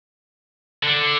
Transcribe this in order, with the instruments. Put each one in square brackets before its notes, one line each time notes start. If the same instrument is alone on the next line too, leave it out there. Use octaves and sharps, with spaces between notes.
[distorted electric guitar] D3